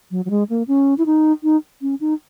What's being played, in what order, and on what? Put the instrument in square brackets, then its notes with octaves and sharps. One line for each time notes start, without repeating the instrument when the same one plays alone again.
[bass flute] F#3
F#3
G#3
A#3
C#4
E4
D#4
D#4
C#4
D#4